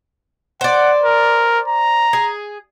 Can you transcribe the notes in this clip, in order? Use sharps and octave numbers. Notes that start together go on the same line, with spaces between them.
C5 D5 F#5
A#4
A#5
G#4